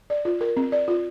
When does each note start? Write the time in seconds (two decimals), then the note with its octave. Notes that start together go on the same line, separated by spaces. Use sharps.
0.10 D5
0.25 F4
0.41 A#4
0.57 C4
0.72 D5
0.88 F4